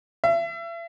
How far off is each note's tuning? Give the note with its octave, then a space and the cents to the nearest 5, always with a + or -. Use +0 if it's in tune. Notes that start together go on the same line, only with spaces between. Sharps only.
E5 +35